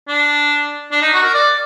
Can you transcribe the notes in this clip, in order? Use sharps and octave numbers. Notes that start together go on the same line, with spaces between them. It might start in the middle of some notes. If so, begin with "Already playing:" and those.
D4
D4
D#4
F#4
A#4
D5